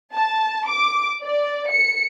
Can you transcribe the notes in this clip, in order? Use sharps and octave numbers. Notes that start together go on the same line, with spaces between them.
A5
D6
D5
C#7